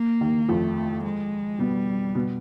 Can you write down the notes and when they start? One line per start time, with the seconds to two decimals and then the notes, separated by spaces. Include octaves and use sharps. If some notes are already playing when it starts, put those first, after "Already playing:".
Already playing: A#3
0.21 D#2 D#3
0.48 F2 F3 A3
1.04 G#3
1.59 B2 G3 B3
2.15 B2 B3